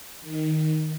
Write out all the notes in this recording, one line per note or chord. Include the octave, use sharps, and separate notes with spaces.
D#3